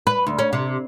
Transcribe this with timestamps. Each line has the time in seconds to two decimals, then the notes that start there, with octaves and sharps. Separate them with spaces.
0.07 B4
0.27 D2
0.39 C#4
0.53 C3